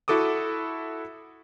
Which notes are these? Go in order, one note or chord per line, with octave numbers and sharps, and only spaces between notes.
E4 F#4 A4 D6 D#6